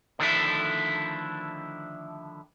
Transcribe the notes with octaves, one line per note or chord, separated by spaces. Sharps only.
D3 D#3 F3 A3 D4 E4